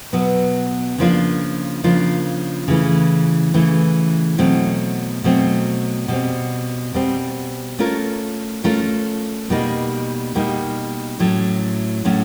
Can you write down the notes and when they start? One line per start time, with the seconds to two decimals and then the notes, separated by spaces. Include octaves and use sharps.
0.13 B2 F#3 B3
0.98 C#3 F3 A#3 D4 F4
1.84 C#3 F3 A#3 D4 F4
2.68 C#3 E3 A3
3.54 C#3 E3 A3
4.38 B2 F#3 A3 C4
5.24 B2 F#3 A3 C4
6.08 B2 G3 C4
6.94 B2 G3 C4
7.79 A3 C#4 F4 A#4
8.64 A3 C#4 F4 A#4
9.50 B2 G3 A#3 D#4
10.35 B2 G3 A#3 D#4
11.20 A2 F#3 A3 C#4
12.05 A2 F#3 A3 C#4